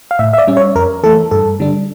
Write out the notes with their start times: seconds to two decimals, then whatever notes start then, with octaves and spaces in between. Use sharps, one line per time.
0.11 F5
0.19 A2 E5
0.33 E5
0.38 D5
0.47 G3 C#4
0.57 C#5
0.75 F2 A#4
1.03 E3 A3 A4
1.31 G2 A4
1.60 D3 G3 D4